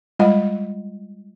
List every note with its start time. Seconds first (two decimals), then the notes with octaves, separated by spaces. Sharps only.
0.19 G3 G#3 F4 D#5 F#5 B5